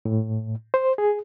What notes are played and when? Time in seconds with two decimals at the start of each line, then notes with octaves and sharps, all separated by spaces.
0.05 A2
0.74 C5
0.98 G#4